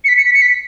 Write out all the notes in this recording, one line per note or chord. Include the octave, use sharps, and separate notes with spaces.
C#7
B6
C#7
B6
C#7
B6